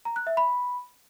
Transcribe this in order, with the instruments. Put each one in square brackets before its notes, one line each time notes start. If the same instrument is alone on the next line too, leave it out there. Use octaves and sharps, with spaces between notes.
[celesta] A#5
F#6
E5
B5